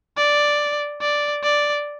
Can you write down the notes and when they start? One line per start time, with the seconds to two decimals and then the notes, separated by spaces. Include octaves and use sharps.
0.17 D5
1.02 D5
1.43 D5